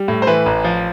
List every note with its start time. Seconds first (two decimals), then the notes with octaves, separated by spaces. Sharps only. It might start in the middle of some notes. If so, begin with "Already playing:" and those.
Already playing: G3
0.08 A2
0.22 C5
0.27 E3 B4
0.46 A1
0.64 F3